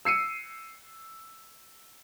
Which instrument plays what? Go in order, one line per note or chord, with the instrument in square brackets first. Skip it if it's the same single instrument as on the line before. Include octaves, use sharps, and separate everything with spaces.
[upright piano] E6 C7 C#7 D#7